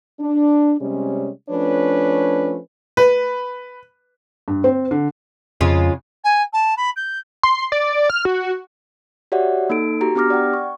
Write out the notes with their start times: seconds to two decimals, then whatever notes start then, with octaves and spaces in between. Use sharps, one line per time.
0.20 D4
0.80 C3 G3 G#3 C#4
1.50 F3 A3 C#4 D4 B4 C#5
2.97 B4
4.48 G2
4.64 C4
4.91 D3
5.61 F2 C#3 G#3 F4
6.24 G#5
6.53 A5
6.77 B5
6.96 G6
7.43 C6
7.72 D5
8.10 F6
8.25 F#4
9.32 F#4 G4 C#5 D5 E5 F#5
9.70 A#3 D#4 A4 D7
10.01 F#4 G4 A#5
10.15 B3 D4 G4 D6 F6 A#6
10.30 D5 F#5 G5
10.53 C#6